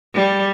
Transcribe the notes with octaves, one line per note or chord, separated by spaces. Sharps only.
G3